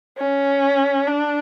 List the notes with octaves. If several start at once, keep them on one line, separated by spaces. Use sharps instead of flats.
C#4
D4